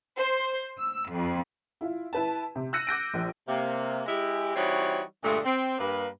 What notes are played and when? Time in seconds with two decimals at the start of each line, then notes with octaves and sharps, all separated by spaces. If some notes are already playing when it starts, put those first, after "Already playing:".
0.18 C5
0.79 E6
1.11 F2
1.81 E4 F4
2.13 E4 B4 A5
2.56 C3
2.73 E6 F#6 G6 A#6 C#7 D#7
2.87 D6 G6 A#6 D7
3.14 A#1
3.48 C3 A#3
4.06 G#3 E4 G4
4.56 E3 G3 C4 D#4 F#4 C#5
5.23 G2 A#2 D3 G#3 A3
5.44 C4
5.79 G2 A#3 B4